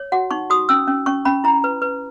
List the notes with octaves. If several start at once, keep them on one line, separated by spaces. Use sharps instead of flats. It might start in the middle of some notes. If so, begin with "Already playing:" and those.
Already playing: C#5
F#4 F#5
D#4 C#6
F#4 D#6
C#4 E6
C#4
C#4 C#6
C#4 B5
E4 A#5
B4
B4